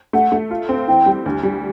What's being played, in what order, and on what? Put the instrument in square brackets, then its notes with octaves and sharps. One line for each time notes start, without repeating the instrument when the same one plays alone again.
[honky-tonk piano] A3 [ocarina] F#5
[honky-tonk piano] A3
F4
C4
[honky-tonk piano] E3 [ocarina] G5
[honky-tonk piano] G3
D2
G3